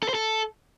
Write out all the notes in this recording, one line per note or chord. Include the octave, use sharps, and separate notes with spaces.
A4
C5
A4